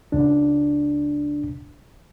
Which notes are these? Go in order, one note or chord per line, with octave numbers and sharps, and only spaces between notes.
C#2 D4